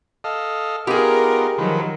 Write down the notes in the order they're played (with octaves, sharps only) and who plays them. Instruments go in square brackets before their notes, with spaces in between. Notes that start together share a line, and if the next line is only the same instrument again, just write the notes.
[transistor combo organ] A4 D#5 F5
[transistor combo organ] B3 D#4 F4 [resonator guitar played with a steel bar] G4 G#4 [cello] A#4
[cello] D#3 F#3 [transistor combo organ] F3 B4